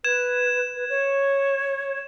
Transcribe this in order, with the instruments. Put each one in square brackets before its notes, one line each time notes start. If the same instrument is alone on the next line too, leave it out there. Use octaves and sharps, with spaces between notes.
[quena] B4 [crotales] G#6 E7
[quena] B4
C#5